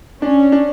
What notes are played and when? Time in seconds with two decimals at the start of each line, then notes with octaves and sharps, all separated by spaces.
0.22 C#4 D4
0.52 D4